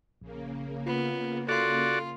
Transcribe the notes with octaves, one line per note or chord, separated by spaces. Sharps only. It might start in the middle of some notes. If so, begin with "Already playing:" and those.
A#1 C#3 A#3
B3 F4
F4 F#4 A4 D5